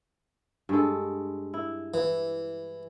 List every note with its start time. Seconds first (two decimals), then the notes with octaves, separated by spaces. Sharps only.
0.69 G2 G#3 A4
1.54 E4
1.94 E3